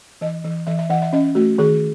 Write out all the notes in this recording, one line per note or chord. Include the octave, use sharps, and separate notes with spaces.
E3 D#5
E3
E3 E5
E5
E3 F#5
E5
C#4 D#5
A3 F#4
D#3 G#4